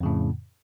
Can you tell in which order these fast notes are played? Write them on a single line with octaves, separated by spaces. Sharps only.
F2 C#3 A2